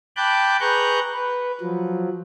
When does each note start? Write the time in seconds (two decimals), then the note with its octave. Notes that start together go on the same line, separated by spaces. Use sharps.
0.16 G5 A5 B5 D6 F#6 G6
0.60 G#4 B4 A#5 C#6 F#6 G6
1.14 B4
1.61 F3 F#3